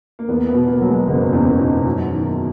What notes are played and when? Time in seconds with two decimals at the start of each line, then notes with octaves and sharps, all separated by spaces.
0.19 A#3
0.28 E2 B3
0.49 B3
0.54 B2
0.68 A#3
0.81 F#3
0.88 G#3
1.07 F#1 A#3
1.33 E2 C#4
1.51 C#4
1.59 B2 D#4
1.86 F#2
2.11 D#3